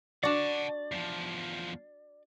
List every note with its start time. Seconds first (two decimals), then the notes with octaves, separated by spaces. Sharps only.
0.23 D4 F#4 D5 F#5 A5
0.92 E2 F3